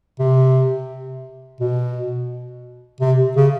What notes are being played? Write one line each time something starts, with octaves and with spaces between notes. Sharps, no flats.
C3
B2
C3
C#3